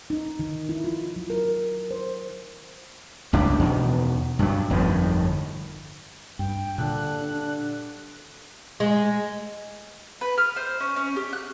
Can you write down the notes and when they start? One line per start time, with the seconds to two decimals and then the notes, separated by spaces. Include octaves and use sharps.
0.10 D#4
0.39 D#3
0.69 E4
0.84 F4
1.16 F#3
1.30 A#4
1.91 C5
3.33 C#2 A2 G3 D4
3.59 E2 B2 D#3
4.39 G2 F#3
4.70 G1 F2 A2 D#3
6.39 G2 G5
6.78 G2 A#2 D3 A4 F#5 F#6
7.22 D4
8.80 G#3
10.21 B4
10.38 F6
10.56 C5
10.80 C#4
10.96 C#4
11.16 G4
11.33 F#6